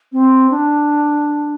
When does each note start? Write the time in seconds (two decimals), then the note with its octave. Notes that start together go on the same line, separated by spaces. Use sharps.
0.12 C4
0.50 D4